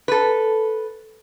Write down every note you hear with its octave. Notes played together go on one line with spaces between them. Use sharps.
A4 B4